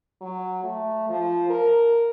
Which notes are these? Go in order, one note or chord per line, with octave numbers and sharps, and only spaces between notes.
F#3
A3
F3
A#4